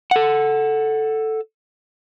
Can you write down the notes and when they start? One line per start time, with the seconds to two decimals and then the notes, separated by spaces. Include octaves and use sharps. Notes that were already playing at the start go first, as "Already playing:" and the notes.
0.11 A4 F#5